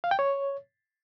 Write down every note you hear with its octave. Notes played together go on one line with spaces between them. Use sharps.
F5
G5
C#5